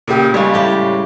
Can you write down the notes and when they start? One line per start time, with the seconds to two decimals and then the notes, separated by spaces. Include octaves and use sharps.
0.08 A#2 C#3 G4
0.34 C#3 G3 G#3 C#5
0.54 A2 G4